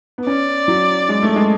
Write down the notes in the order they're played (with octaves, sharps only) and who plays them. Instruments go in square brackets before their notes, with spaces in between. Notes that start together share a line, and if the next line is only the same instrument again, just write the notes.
[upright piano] B3
[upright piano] C#4 [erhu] D5
[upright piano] F#3
G#3
A3
G#3